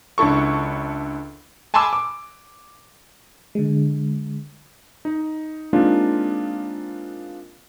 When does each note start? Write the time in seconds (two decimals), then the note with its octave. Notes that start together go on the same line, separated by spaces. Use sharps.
0.18 C#2 D4 E4 A4 C#6
1.74 G#5 A5 B5 C6 D6 E6
1.93 D6
3.55 D3 G#3
5.05 D#4
5.73 G#3 A#3 C4 D4 D#4 F4